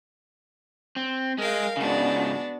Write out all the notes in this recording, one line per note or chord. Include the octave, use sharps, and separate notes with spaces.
C4
G#3 A#4 F5 G5
G#2 C#3 B3 D4 F#4